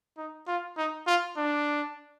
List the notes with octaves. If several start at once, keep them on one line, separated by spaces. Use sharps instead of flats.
D#4
F4
D#4
F4
D4